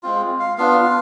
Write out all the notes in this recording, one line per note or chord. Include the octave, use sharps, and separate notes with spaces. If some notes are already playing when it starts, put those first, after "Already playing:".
G#3 C4 F4
F5
B3 D4 F4 F5